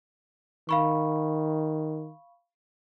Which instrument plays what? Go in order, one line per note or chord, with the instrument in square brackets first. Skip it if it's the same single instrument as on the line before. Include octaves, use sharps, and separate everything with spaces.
[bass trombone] D#3 [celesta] F5 B5 C#6